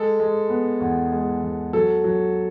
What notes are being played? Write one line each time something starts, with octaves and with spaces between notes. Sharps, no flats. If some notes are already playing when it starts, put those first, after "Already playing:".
Already playing: G#3 A4
G#3
B3
E2
G#3
E2
F#3 A4
F#3